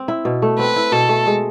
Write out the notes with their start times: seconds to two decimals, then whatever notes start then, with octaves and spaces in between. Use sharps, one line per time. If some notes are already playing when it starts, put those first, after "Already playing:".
Already playing: C4
0.08 E4
0.25 B2
0.42 A3
0.59 C4 B4
0.76 E4
0.92 B2 A4
1.09 A3
1.27 G#3